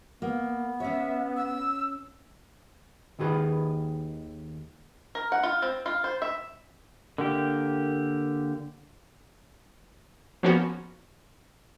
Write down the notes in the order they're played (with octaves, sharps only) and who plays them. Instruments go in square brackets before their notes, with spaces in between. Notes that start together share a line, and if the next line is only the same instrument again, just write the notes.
[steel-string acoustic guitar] A#3 [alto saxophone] B3
[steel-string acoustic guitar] C#4 C#5 [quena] E5
[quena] E6
[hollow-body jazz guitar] D#2 D#3 G#4 B4
[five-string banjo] A#4
F#5
F4
C4
F4
C5
E5
[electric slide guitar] D3 A#3 G4
[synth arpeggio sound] F3 A#3 B3 C#4 F#4